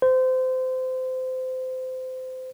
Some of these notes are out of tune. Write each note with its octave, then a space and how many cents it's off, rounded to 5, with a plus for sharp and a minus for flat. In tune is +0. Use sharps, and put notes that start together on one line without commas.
C5 -25